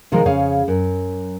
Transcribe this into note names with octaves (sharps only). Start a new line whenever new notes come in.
C3 D#3 F3 G#3 A#4
F2 C#3 G#4 C#5 F5
F#2